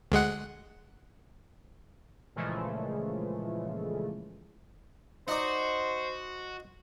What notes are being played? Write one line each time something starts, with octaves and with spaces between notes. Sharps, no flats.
D2 G#3 F#5
A#2 C#3 E3 F3 G#3 A3
D#4 F#4 C5 D5